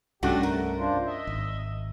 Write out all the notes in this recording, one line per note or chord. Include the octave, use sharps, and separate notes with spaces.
C2 G2 A3 C#4 D4 F#4 G4
A3 A#4
D4 F4 C5
D#5 E5
G#1